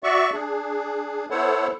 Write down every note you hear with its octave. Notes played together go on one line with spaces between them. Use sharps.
F#4 D5 E5 C#6
D4 G#4
B3 E4 A4 C5 C#5 F#5